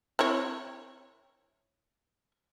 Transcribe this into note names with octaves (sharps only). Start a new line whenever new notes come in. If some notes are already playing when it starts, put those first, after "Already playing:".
C4 E4 C#5